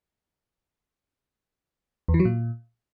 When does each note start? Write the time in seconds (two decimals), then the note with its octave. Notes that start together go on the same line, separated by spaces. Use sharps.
2.08 E2
2.14 E3
2.20 F#3
2.25 A#2